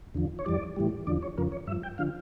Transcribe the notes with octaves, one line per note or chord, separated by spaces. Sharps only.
E2 D3 F3
C#5
F2 E3 G3 D5
A2 E3 G3
E2 D3 F3 D5
C#5
F2 C#3 F3 A#4
C#5
G2 F3 E5
G5
D3 F3 F5